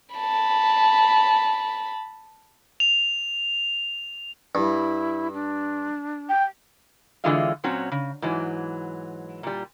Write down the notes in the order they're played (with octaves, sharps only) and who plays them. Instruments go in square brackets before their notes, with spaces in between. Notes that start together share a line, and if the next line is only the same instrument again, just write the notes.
[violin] A5 B5
[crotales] F7
[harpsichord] G2 [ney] E4
[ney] D4
[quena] G5
[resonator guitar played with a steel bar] D3 E3 G#3 F4 D#5 F5
A#2 F#3 C4 C#4 F#4
C#3
G#2 E3 F#3
A#2 G3